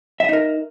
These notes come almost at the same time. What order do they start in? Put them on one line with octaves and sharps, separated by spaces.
E5 D#5 D#4 A#4